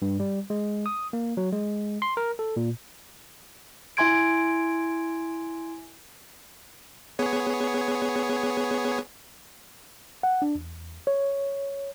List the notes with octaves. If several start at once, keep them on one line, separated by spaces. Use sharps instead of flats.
G2
G3
G#3
D#6
A#3
F#3
G#3
C6
A#4
A4
A#2
E4 E5 G#5 C6 G#6 D7
B3 G#4 C#5
F#5
D4
E2
C#5